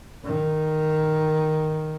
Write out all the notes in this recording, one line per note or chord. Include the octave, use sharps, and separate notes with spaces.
D#3